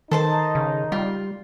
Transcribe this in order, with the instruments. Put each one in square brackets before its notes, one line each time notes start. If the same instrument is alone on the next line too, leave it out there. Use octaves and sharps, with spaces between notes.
[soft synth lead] D#3 [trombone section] D#4 [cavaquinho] A4 C5 A5
[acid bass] C#3
[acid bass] G3 [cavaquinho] F4